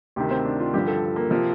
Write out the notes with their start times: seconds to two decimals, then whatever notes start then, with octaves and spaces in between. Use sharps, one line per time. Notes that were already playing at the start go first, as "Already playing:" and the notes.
0.16 D2 C3 D#3 G4
0.31 C4
0.45 D4
0.60 F4
0.74 G2 D3 F3 G4
0.88 A4
1.16 A#3
1.31 C3 F3